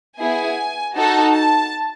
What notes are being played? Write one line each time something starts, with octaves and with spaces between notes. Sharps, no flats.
B3 E4 G#4 G#5
D#4 F#4 A4 A5
A5